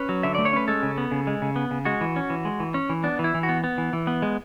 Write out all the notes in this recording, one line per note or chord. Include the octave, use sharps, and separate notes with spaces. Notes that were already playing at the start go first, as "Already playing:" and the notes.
Already playing: C#4 B4
F#3
D3 E5
A3 D5
C#5
C#4 B4
G#3 A4
C#3
B3
C#3
G#3
C#3
B3
C#3
G#3 F#4
E3
C#4
E3
G#3
E3
C#4
E3
B3 D4
E3
E4
E3
F#4
B3
B3
E3
E3
B3
G#3